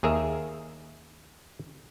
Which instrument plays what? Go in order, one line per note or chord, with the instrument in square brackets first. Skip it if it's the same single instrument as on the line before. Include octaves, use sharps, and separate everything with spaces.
[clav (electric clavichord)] D#2 G#4 A#4 E5